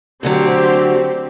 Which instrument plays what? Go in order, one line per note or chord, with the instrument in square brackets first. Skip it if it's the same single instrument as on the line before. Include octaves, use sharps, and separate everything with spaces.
[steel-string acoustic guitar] D2 D3 F#3 [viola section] C4 G4